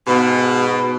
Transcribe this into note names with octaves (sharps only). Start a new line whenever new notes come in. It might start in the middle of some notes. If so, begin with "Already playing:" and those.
G#2 B2